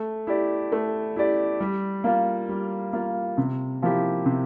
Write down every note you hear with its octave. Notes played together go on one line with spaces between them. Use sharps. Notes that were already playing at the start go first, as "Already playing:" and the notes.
Already playing: A3
E4 G4 D5
A3
E4 G4 D5
G3
A#3 F4
G3
A#3 F4
C3
F3 A#3 E4 G4
C3